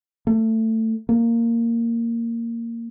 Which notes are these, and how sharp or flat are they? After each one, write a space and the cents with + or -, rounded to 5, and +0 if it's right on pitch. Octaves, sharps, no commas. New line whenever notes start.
A3 +20
A#3 -10